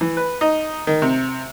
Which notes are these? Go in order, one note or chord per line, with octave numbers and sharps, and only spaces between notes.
E3
B4
D#4
D#3
C3